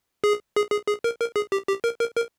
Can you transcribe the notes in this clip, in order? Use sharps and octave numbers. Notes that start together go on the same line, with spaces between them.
G#4
G#4
G#4
G#4
A#4
A#4
G#4
G4
G4
A#4
A#4
A#4